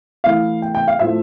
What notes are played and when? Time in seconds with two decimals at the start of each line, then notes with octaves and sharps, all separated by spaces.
0.24 E3 A3 E4 F5
0.62 G5
0.75 G5
0.88 F5
0.99 A2 F3 A3 E5